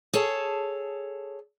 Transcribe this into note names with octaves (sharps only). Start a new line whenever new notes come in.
G#4 A4 C#5 A5